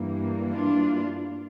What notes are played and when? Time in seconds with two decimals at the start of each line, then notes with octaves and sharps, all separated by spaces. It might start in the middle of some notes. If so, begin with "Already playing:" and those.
Already playing: G2 E3 G3 A#3
0.52 D4 F4